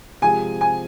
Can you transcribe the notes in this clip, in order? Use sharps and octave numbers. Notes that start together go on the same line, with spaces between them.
C3 F3 G#3 C4 G#4 G#5
G#5